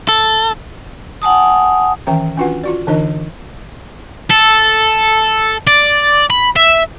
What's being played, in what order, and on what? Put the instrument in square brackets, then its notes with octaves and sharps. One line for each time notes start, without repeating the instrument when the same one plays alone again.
[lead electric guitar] A4
[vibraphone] F#5 G#5 A5 D#6
[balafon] D#3 E3 C#4 E5 G5
C#4 D4 F4 F#4 B4 F#5
F4 F#4 D5
D3 E3 D4 D#4 A#4 D#5
[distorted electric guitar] A4
D5
B5
E5